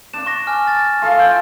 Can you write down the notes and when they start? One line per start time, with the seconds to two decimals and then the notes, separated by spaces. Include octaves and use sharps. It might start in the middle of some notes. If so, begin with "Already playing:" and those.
0.13 D4 E7
0.26 C#6 A#6
0.47 G#5 F6
0.67 A6
1.02 F4 A4 F5
1.19 G5